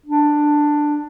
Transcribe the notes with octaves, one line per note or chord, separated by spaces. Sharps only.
D4